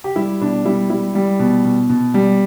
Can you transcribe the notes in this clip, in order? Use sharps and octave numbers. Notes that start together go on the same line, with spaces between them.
G4
G3 E4
B2 D4
G3 E4
G3 E4
G3
B2
B2
B2
G3